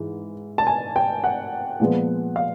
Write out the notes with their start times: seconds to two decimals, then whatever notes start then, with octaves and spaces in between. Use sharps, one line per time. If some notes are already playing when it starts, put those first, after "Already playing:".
Already playing: G#2 E3
0.58 A5
0.67 G#5
0.96 G5
1.24 F#5
1.80 A#2 F3 G#3 B3
2.36 F5